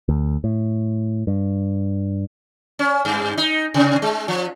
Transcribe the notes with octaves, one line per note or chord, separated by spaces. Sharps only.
D2
A2
G2
C#4
G2
D#4
C3
G#3
F3